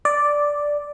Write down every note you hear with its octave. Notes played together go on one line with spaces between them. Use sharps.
D5